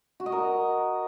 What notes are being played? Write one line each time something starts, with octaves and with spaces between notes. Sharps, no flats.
F#4
D#5
A#4